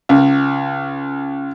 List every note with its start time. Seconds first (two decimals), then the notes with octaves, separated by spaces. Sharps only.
0.09 C#2